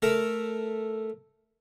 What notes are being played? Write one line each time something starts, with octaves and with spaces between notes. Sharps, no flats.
A3 A4 A#4